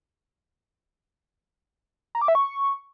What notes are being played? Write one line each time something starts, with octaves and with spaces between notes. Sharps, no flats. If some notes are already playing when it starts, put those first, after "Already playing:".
A#5
D6
E5
C#6